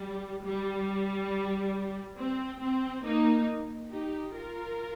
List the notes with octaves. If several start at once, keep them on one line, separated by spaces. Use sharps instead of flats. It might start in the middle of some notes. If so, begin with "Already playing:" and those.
Already playing: G3
G3
C4
C4
A#3 D#4
D#4 G4
F4 A#4